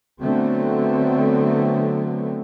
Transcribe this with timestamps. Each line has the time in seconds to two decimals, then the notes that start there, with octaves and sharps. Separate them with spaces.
0.22 D3 F#3 A3 B3 C4